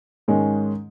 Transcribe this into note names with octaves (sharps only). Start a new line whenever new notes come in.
G#2 D#3 G#3 C#4